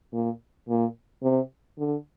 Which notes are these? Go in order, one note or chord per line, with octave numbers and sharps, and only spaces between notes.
A#2
A#2
C3
D3